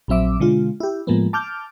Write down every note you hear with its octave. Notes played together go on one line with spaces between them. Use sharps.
A#1 F#3 C4 E5 D6
B2 D3 G#3 F4
E4 G4
A2 F3 G#3 A#3 B3
A5 D6 F6 G6